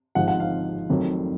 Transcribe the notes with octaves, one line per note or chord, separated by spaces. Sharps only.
G#1 G#2 F3 F#5
F#5
F5
F1 F2 D#3 F#3